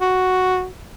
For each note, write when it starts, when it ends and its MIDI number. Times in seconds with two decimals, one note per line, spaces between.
0.01 0.66 66